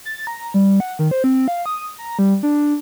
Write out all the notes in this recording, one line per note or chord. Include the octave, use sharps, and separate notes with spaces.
A6
A#5
G3
F#5
D#3
C5
C4
F5
D#6
A#5
G3
D4